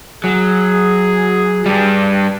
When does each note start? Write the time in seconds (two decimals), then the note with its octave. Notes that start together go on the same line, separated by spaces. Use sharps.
0.24 F#3 G#4
1.66 G2 G3